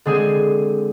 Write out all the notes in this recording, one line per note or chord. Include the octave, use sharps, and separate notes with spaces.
D3 G#3 C4 G#4